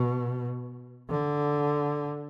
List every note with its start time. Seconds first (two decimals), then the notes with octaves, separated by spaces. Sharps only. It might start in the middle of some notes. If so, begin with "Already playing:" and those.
Already playing: B2
1.09 D3